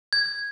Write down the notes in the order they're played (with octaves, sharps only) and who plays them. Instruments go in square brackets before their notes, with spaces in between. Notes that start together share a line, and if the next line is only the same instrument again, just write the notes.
[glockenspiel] G#6